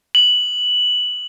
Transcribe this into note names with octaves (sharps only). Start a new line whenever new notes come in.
F#7